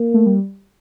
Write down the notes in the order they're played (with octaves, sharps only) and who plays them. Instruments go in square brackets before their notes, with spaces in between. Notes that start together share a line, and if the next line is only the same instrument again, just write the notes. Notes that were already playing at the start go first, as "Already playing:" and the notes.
Already playing: [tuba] A#3
[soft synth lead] A3
G3